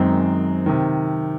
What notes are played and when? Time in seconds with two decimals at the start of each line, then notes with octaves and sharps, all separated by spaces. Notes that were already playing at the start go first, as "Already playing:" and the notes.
Already playing: F#2 D#3 G#3 C4 D#4
0.66 C3 D#3